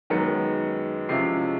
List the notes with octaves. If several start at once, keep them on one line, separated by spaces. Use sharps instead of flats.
F#2 D#3 G#3 B3 C#7
C3 F3 G#3 C#4 E4 C7